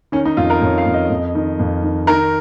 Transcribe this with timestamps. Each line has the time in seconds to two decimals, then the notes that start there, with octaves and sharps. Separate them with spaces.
0.12 D#3 C#4
0.25 D#4
0.37 F2 F4
0.50 A#4
0.62 F2 C#5
0.78 F5
0.87 F2
0.94 D#5
1.10 F2
1.35 D#3
1.59 F2
1.83 D#3
2.07 D#3 A#4